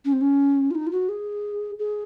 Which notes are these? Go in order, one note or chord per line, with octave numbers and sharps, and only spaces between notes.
C#4
C4
C#4
F4
D#4
F4
F#4
G#4
G#4